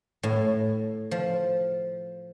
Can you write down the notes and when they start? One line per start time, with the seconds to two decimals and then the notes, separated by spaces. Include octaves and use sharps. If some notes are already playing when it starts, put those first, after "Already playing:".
0.23 A2
1.11 F3